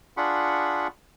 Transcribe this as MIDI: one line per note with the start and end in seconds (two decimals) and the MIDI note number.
0.17 0.88 62
0.17 0.88 65
0.17 0.88 68
0.17 0.88 78
0.17 0.88 83
0.17 0.88 85